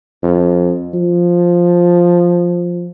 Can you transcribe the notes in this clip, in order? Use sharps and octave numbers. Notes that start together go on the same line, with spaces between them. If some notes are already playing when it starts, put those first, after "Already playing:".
F2
F3